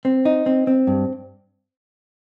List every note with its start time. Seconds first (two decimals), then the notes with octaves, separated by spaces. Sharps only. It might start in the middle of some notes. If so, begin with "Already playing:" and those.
0.05 C4
0.25 D#4
0.46 C4
0.67 C4
0.87 G2